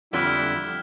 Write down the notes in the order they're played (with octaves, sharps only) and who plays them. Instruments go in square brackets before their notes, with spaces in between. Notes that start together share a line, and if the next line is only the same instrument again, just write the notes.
[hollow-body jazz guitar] F2 D3 F4 [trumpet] G3 [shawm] E4 [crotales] F6 F#6 G7